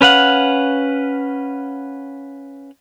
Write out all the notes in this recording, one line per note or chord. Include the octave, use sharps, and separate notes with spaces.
C#4 B4 F5 F#5